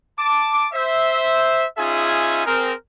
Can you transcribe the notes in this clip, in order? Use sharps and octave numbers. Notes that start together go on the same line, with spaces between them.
A5 D6
C5 E5
C#4 D#4 F4 G#4 E5 G#5
C4 G#4 A#4